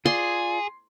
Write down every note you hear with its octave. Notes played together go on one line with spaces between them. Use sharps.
F4 G#4 D5 C6